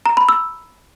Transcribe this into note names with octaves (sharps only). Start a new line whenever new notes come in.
A#5
B5
E6